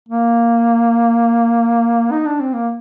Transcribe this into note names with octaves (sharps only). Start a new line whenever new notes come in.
A#3
D#4
D4
C4
A#3